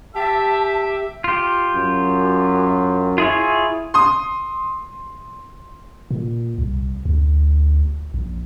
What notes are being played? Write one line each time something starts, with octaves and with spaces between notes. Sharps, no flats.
G4 E5 A5
F4 G4
F#2
E4 F4 G#4 C#5
C6 D#6
A#2
C2
D2
A#1